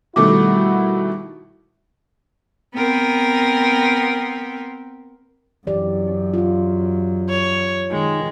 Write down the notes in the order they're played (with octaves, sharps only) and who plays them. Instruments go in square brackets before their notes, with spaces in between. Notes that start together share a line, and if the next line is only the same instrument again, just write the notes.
[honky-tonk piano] B2 D#3 A3 [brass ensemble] G3 E4 F#4 [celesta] D6
[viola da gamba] B3 C4 A#4
[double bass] F#2 [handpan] E3 G4 D5
[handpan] F4 F#4
[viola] C#5
[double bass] D#3 [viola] G#3